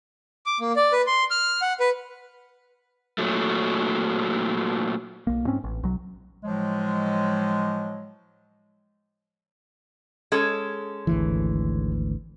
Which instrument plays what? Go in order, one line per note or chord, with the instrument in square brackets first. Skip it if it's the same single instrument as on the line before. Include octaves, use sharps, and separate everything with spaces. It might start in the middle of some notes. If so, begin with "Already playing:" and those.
[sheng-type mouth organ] D6
A#3
D5
B4
C6
F6
F#5
B4
[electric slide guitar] A#2 F#3 A3
[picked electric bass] B1 A#3
G#2 C4 C#4
A1
B1 F#3
[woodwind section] A2 F3 F#3 G#3
[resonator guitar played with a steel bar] G#3 C#4 A4
[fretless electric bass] G#1 D2 E3